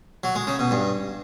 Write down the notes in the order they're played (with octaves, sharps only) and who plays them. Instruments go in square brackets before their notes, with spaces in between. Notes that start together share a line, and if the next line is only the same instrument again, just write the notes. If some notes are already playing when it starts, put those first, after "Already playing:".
[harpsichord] F#3
G#3
C#3
B2
G2